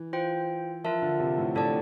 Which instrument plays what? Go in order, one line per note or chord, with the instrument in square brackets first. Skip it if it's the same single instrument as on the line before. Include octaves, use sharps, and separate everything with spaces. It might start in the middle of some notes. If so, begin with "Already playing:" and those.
Already playing: [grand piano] E3
[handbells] F4 C5 G5
[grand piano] F3 [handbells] F4 A#4 E5 A5
[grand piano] D3
C3
A2
[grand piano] A2 [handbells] D4 A4 D5 A5